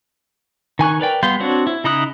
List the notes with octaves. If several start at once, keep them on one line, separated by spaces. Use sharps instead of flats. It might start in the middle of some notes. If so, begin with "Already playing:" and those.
D#3 G#5 C#6 F#6
A#4 B4 D5 G5
G3 B3 F5 C6 G6
C4 D4 F#4 C#5
E4
C#3 D#4 E4 D#6 F#6